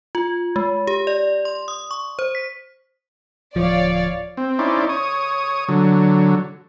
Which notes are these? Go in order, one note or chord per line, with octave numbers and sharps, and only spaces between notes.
F4
G#3
G4
D5
C6
D#6
C#6
C5
B6
D1 F3 C#5 D5 F5
C4
C#4 D#4 E4 C5 D5
C#5 D#6
D3 F#3